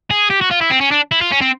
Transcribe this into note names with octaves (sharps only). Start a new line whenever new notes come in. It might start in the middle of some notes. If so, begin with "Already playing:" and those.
G#4
G4
F#4
F4
E4
C4
C#4
D4
E4
F4
C#4
C4